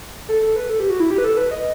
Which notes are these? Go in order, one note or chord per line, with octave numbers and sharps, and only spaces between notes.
A4
A4
B4
A4
G4
F#4
E4
G4
B4
A4
B4
D#5